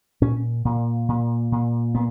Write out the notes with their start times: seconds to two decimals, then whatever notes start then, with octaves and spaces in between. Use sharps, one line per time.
0.22 A#2 C#4
0.65 A#2
1.09 A#2
1.52 A#2
1.95 A#2 B3